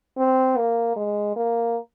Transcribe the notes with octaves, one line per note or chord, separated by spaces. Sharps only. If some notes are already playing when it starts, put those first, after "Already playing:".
C4
A#3
G#3
A#3